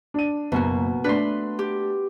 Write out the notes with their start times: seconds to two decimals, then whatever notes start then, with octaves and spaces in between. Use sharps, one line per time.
0.14 D4 D#7
0.52 F#1 B2 A#3 F#4
1.04 A3 D4 B4 C6
1.59 G4